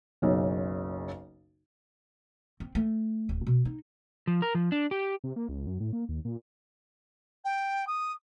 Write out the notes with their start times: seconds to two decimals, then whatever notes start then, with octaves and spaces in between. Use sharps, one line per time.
0.22 F#1 B1 C#3
2.60 C4
2.75 A3
3.29 D1
3.47 B2
3.65 D#4
4.27 F3
4.42 A#4
4.55 F3
4.72 D4
4.91 G4
5.24 C3
5.36 A#3
5.49 C#2
5.67 F#2
5.80 A2
5.93 A#3
6.09 D#2
6.25 A#2
7.44 G5
7.87 D#6